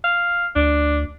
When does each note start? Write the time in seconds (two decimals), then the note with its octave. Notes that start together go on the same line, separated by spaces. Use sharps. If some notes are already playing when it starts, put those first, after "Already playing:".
0.04 F5
0.56 D2 D4